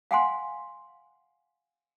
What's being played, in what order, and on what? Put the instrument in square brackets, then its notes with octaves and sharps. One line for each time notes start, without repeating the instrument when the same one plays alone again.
[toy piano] F5 F#5 G#5 C6